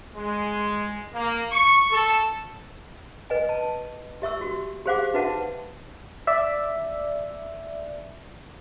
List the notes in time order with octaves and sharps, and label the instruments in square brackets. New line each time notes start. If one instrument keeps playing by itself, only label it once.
[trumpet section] G#3
A#3
C#6
A4
[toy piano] B4 D#5 G#5
A5
G4 E5 C#6 E6
F#4 G4
G4 G#4 C5 F5 F#5 D6
D#4 F#4 B4 E5 F#5 A5
[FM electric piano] D5 E5